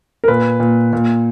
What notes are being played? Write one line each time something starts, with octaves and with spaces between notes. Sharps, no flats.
A#4
A#2 B4
A#2
A#2